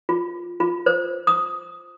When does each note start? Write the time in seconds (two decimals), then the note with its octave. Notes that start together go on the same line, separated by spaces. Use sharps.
0.09 F4
0.60 F4
0.86 C5
1.27 D#6